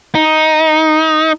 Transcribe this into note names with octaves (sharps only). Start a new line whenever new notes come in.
D#4